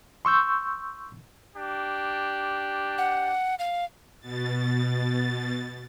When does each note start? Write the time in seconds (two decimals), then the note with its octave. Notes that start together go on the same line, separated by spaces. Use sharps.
0.25 C6 C#6 E6 G6
1.56 D4 G4
2.98 F#5
3.59 F5
4.20 B2 A6